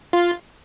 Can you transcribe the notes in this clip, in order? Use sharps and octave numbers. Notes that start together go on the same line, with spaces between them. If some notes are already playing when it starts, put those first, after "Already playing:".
F4